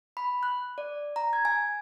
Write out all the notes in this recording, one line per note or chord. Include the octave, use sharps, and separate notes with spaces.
B5
F#6
D5
A#5
G#6
G#5